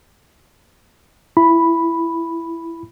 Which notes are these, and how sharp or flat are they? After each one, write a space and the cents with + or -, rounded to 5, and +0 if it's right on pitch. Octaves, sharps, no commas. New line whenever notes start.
E4 +15 B5 +0